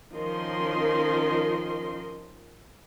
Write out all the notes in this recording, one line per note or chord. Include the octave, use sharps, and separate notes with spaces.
D#3 F3 C#4 A#4 D#5 C6